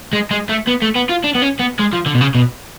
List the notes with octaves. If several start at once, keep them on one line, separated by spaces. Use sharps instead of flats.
G#3
G#3
A3
B3
A3
B3
F4
D4
B3
C#4
B3
G#3
F3
D3
B2
C#3
B2